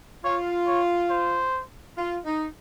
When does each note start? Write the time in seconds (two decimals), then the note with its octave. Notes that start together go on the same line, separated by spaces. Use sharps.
0.24 F4 C#5
0.67 C#5
1.10 C5
1.97 F4
2.25 D#4